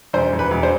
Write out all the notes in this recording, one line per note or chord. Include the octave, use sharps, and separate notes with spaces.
E1 C5
E1
B4
E1
C5